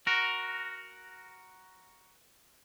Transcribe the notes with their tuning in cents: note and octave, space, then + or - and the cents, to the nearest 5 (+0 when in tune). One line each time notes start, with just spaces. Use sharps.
F#4 +5 A#4 +5